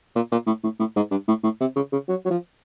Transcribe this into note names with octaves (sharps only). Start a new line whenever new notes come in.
A#2
A#2
A2
A2
A2
G#2
G2
A2
A2
C3
C#3
C#3
F#3
F#3
F3